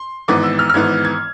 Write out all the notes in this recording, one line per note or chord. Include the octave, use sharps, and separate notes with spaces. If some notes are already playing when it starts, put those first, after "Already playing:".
Already playing: C6
G#1 G#2 E3 B3 D6
E6
F6
F6
G#1 G#2 E3 B3 G#6
G#6